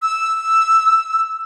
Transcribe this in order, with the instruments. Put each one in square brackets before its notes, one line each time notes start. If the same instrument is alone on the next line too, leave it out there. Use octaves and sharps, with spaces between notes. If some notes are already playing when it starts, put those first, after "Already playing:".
[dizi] E6